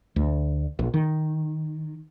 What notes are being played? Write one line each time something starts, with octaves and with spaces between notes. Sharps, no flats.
D2
A#1
D#3